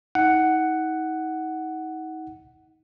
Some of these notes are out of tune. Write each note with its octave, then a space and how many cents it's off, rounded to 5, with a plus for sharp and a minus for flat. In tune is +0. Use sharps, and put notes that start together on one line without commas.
D#4 +35 F#5 +5